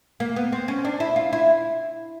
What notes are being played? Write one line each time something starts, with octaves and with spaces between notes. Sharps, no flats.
A#3
B3
C4
C#4
D4
E4
F4
E4